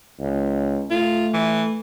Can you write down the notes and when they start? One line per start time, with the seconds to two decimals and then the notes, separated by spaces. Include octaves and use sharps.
0.21 C#2
0.90 A3 F4
1.33 E3